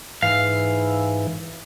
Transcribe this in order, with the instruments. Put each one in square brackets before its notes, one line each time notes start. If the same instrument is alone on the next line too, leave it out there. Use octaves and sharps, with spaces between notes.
[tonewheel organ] G#2 E3 [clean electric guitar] F5